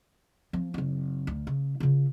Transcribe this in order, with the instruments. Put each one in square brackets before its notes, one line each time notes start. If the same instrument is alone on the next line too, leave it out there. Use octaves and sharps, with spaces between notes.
[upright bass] F3 C4
F#1 C4
D2
C#3
C#3 F4